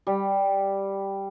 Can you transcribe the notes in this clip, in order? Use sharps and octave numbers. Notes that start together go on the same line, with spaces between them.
G3